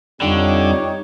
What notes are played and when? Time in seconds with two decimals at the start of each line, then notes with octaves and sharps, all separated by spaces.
0.22 F2 D3 G3 C4 D#4 F4 G4 C#5